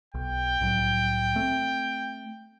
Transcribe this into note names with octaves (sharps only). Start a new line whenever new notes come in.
B1 G5
C2 A2 F#3
A3 C4